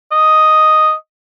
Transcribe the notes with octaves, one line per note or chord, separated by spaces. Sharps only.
D#5